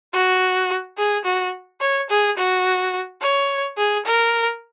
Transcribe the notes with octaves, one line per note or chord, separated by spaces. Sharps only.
F#4
G#4
F#4
C#5
G#4
F#4
C#5
G#4
A#4